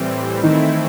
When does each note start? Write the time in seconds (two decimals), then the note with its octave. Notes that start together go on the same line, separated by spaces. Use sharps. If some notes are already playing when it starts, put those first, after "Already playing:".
Already playing: A2 E3 G3 C4
0.43 D#3 E3 A3 C4 D#4 E4